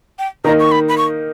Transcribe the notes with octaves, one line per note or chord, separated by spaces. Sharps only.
G5
D#3 A#3 D#4 A#5
C#6
B5
B5
C#6